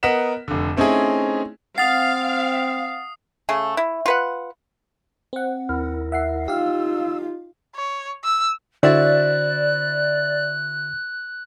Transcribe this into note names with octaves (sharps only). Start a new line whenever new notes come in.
B3 A#4 D#5 F#5 B6 E7
F1 D3
A3 C4 C#4 D#4 E4 G#4
C4 F5 F#5 D#6 A6 C7
C#3 A3 G#4
E4
F4 B4 F#5
C4 F#5
D#2 E4 A#4
E5 F#5 C7
D#4 F4 G4 F5 E6
C#5
E6
D3 E4 F#4 C5 D5 E5 F#6